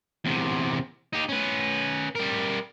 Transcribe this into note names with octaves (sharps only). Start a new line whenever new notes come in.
E2 C3
D#4 G4
C#4 B4
G3 A#4